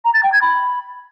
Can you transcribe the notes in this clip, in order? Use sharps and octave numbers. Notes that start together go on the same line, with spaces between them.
A#5
A6
G5
G#6
B5